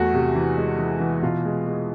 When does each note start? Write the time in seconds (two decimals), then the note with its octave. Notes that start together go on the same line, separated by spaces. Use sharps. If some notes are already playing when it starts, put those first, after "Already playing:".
Already playing: E2 A3 F#4
0.14 C3
0.35 E3
0.58 G#3
0.78 E3
1.00 E3
1.22 B2 F4
1.45 G#3
1.67 G#3